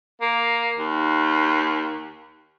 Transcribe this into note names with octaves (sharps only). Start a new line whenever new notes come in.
A#3
D#2